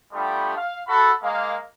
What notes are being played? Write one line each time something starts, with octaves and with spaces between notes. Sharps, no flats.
G3 A3 B3 D4 F4 G4
F5
F#4 A4 B5
G#3 A#3 F5